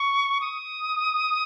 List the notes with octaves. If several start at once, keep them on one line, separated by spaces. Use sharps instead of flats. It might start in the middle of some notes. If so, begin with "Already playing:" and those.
Already playing: C#6
D#6